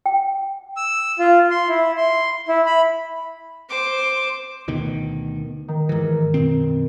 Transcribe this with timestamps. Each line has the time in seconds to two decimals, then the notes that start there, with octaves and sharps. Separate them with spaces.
0.06 G5
0.77 E6
1.19 F4
1.51 C6
1.69 E4
1.97 C6
2.49 E4
2.66 B5
3.69 C5 D6
4.68 D2 B2 D#3
5.68 D#3
5.89 G#2 E3
6.34 F#2 B2 C4